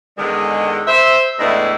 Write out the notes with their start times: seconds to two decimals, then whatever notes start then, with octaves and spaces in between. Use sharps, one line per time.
0.18 E2 D3 D#3 G#3
0.87 C5 E5
1.39 E2 A2 E3 G#3 A3 D4